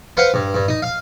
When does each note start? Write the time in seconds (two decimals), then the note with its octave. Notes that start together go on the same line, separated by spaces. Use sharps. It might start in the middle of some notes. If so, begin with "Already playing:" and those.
0.17 B4 C5 F5 F#5
0.34 G2
0.54 G2
0.68 D#4
0.82 F5